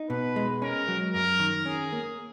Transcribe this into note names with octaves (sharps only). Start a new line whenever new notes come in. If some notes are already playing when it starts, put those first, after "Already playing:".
Already playing: D#4
B2 B4
G#3
C#4 A#4
F#3
F#2 A#4
D#3
C#4 G#4
A#3